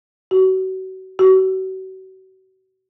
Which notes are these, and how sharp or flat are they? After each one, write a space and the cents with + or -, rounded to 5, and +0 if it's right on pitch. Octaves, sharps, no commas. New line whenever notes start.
F#4 +30
F#4 +35